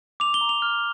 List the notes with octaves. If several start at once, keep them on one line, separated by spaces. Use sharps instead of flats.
D6 F7
G7
A#5
F7
F6